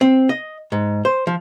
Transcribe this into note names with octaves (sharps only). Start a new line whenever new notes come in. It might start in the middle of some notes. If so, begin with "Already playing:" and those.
C4
D#5
G#2
C5
F3